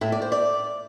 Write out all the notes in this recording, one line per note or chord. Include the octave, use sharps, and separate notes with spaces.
A2 E5
D5
C5
D5